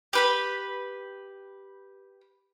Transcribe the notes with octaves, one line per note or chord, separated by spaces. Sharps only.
G4 B4 B5